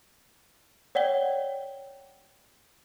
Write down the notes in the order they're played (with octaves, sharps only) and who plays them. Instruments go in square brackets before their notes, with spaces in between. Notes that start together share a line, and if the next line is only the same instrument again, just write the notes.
[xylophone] C#5 D5 F#5 G5 G7